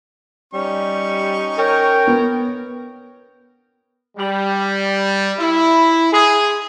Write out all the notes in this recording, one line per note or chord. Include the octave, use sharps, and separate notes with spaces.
G3 C#4 D#4 C#6
A#4 C#5 G5
B3
G3
E4
G#4